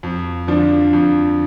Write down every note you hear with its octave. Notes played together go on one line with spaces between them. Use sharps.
F2
D3 F3 D4
F2